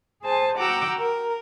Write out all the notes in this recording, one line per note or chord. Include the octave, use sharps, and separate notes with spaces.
G#4 C5 G#5 A5
F#4 F#5 G5 A#5 D6 E6
A#4